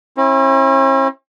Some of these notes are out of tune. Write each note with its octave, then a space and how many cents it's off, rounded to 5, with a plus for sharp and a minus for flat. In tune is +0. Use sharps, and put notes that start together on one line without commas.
C#4 -45 E4 -10